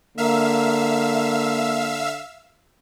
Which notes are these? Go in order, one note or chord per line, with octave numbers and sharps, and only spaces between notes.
D3 A#3 E5 F5 E6